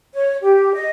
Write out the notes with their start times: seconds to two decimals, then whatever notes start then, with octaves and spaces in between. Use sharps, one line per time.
0.14 C#5
0.43 G4
0.74 D#5